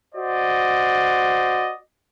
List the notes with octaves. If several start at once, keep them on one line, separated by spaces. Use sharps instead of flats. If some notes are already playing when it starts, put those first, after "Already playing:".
F#4 C5 D5 D#5